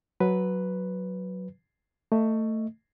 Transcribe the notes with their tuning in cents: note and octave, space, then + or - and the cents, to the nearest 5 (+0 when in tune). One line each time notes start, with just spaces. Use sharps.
F#3 +0 B4 +0
A3 +15 D#5 +0